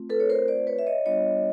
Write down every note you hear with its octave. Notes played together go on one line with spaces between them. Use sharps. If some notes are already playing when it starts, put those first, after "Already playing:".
Already playing: A3 C4 F4
A4 B4
C#5
A#4 C5
C5 D5
B4 C#5
E5
C#5 D#5
G3 B3 D4 F4 C#5 D#5